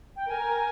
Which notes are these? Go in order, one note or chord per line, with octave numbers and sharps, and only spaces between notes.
G5
A#4 G#5